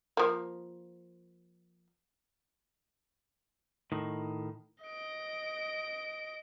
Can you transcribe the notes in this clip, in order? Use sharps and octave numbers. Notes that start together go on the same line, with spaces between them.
F3 A#3
A2 D#3
D#5 D7